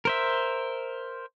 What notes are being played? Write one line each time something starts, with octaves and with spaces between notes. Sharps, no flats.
A#4 C5 E5